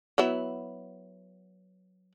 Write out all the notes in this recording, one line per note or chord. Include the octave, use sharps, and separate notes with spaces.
F#3 B3 E4